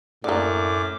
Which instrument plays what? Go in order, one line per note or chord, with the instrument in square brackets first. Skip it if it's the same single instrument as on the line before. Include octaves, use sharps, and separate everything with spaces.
[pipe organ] F#2 D6 [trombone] A2 [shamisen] D3 A#3